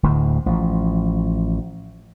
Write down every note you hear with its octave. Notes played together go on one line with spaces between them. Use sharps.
D1 D2 A2
A1 F3